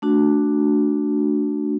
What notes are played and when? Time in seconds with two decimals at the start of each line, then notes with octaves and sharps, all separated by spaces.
0.02 A3 D4 F#4